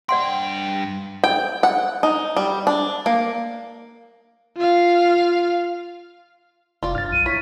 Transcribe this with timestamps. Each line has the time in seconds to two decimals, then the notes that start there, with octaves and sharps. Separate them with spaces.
0.09 G2 D5 F#5 G5 C6
1.24 G5
1.63 F#5
2.03 D#4
2.37 G3
2.67 D4
3.06 A#3
4.57 F4 F5
6.83 F1 F4 D5
6.95 G2 F6 A6
7.12 B1 D#7
7.26 E4 C#5 B6